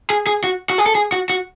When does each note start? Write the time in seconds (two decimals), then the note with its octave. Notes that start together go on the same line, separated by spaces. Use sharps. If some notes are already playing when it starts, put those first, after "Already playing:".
0.10 G#4
0.27 G#4
0.44 F#4
0.70 F#4
0.78 G#4
0.86 A4
0.95 G#4
1.12 F#4
1.30 F#4